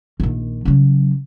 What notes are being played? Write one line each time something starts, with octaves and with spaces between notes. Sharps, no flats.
A#1 D#3
C#3 F#3